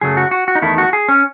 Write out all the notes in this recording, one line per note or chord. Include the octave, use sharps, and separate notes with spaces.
F#2 C#3 F#3 A3 G#4
F#4
F#4
F#4
D#4
E2 D#3 A3 E4
F#4
G#4
C#4